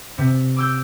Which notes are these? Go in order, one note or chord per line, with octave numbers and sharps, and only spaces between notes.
C3
D6 E6 G6